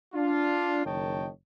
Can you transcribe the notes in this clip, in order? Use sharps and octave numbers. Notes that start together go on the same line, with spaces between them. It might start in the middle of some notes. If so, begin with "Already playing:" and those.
D4 F4
F#1 D#3 C#5 D#5 G5 A5